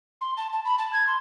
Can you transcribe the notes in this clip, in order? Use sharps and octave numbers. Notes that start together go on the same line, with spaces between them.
C6
A5
A5
B5
A5
G#6
C6